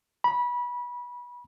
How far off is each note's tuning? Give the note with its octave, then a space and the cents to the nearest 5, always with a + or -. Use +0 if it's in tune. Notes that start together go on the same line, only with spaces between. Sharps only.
B5 -25